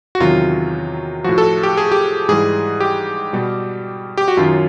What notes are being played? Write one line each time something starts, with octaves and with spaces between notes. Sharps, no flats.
F#4
E2 C3 D#3 F#3 F4
A2 F3 F#4
A4
G4
G#4
G4
G#2 E3 G3 G#4
G4
B2 G3
G4
F#4
F#2 D#3 F#3 F4